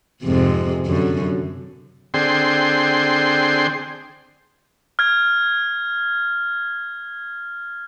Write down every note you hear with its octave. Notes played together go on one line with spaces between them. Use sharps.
F2 G#2 C3
F#2 D3
D3 C4 G#4 G5 C6
F6 G#6